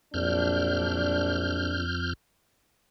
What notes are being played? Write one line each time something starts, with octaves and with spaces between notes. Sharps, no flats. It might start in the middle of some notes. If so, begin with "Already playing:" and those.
A#1 F2 F#3 D4 F6 G6